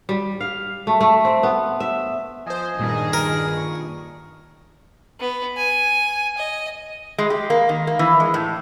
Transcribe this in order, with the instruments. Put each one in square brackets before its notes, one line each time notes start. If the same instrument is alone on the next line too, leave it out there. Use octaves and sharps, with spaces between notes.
[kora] G3
F5
A3
A3
C4
B3
E5
[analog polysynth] F3 C5 [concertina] D#5 G#5
[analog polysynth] G2 A#2 [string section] D#3 G#4
[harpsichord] A#4
[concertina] C#6
[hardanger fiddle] B3
G#5
D#5
[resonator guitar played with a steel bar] G#3
G4
A#3
D#3
A#3
E3
G#3
A2